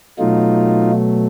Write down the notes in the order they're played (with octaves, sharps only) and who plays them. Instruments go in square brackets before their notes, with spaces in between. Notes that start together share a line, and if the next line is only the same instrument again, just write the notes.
[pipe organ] B2 F#3 A3 D#4 F4